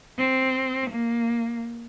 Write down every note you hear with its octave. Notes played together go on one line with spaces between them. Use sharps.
C4
A#3